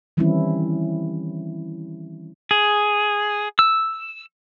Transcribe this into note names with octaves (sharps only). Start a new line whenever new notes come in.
D#3 E3 G3 C4 C#4 E4
G#4
E6